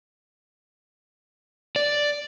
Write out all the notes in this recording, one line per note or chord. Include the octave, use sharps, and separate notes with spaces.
D5